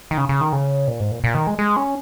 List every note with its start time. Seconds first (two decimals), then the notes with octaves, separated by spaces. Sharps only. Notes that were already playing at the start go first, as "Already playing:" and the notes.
0.11 D#3
0.17 C#3
0.29 C#3
0.41 D#3
0.53 C#3
0.88 A#2
1.00 G#2
1.11 A#2
1.24 A#2
1.35 D#3
1.47 G#3
1.59 G#3
1.77 C#4